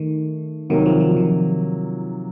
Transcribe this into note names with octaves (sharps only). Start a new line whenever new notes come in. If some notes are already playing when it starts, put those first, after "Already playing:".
Already playing: D#3 A3
C3 D#3 F#3 A#3
F3
F3
D#3